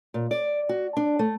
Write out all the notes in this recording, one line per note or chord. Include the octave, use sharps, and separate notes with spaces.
A#2
D5
F#4
D4
A3